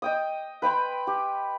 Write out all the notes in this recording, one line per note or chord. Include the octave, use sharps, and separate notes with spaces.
D#5 G5 D#6
B4 G5 B5 C6
G4